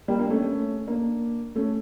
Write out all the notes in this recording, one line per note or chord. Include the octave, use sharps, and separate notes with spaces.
G3 A#3
A#3 D4
A3 C#4
A3 C#4
A#3 D4
A3 C#4